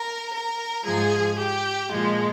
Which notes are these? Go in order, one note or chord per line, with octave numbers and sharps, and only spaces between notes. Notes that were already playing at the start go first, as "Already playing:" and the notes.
Already playing: A#4
A#4
G#2 F3 G#4
G4
A#2 F3 G#3